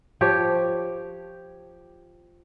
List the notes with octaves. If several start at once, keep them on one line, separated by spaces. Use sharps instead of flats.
F3 G4 C#5